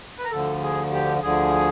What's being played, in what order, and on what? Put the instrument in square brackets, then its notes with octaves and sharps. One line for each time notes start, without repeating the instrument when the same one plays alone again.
[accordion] B4
A#4
D2 D3 F3 A4
G#4
G4
D2 D3 F3 G#4